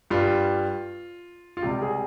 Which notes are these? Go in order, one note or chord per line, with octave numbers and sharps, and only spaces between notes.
G2 G3 F4
F4
C#2 C3 G3 G4
G#4